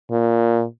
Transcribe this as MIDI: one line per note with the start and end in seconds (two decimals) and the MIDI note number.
0.11 0.64 46